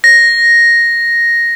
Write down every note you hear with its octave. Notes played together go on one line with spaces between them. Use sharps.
A#6